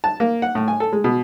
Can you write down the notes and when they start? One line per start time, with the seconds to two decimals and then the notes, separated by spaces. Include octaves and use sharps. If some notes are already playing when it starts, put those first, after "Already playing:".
0.04 A5
0.20 A#3
0.42 F#5
0.55 A2
0.68 G#5
0.80 A4
0.93 G#3
1.04 B2